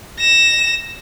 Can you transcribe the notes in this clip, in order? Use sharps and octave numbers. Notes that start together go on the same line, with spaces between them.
A#6 E7